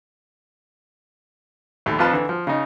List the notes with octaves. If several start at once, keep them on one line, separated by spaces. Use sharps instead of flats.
A#1 D#2 A3
F2 F3 F4 B4 A5
D3 E3
F3
C#3 D#4